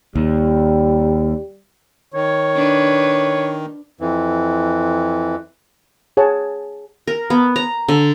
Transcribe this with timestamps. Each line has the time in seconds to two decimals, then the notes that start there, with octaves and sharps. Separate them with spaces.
0.15 D#2 G3
2.14 D#3 C#5
2.55 D4 B4
4.00 F2 E3
6.17 G#4 C#5 F#5 A5
7.07 A#4
7.30 B3
7.56 A#5
7.88 D3